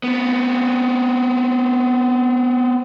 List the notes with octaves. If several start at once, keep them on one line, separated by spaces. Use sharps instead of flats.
B3 C4